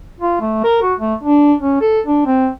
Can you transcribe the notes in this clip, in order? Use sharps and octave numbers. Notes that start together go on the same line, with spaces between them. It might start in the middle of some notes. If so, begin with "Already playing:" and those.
F4
A3
A#4
F#4
A3
D4
C#4
A4
D4
C4